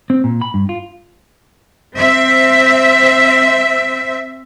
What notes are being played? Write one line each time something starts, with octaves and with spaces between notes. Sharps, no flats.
C4
A#2
B5
G2
F4
C4 E5